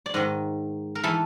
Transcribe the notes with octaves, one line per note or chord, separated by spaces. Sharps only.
D5
G#2 D#3 D#5
A#4
E3 A4